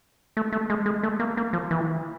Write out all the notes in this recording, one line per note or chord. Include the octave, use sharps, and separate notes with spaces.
A3
A3
G#3
G#3
A3
A#3
A#3
F3
E3